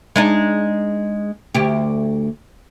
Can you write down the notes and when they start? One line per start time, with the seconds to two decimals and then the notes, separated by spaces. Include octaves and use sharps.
0.16 G#3 D4 D#4
1.55 D2 G4